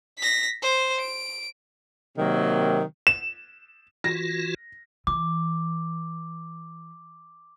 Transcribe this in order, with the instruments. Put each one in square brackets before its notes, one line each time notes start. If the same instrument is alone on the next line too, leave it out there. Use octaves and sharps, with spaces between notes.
[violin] A#6 B6
C5
D7
[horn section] C3 D#3 F#3 A#3
[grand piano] E7
[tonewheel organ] E3 F4 F#4 [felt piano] A#6
[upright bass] E3 [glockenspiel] D6